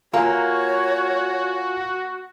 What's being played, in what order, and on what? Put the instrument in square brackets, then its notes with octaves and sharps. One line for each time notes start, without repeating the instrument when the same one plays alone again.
[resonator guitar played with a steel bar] A#3 [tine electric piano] F4 F5 G#5 [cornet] F#4 [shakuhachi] C#5